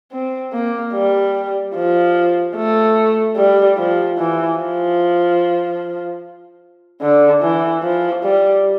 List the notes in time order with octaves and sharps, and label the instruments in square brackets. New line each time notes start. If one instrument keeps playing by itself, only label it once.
[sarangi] C4
A#3
G3
F3
A3
G3
F3
E3
F3
D3
E3
F3
G3